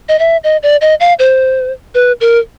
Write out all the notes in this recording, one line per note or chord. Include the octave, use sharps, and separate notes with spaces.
D#5
E5
D#5
D5
D#5
F5
C5
B4
A#4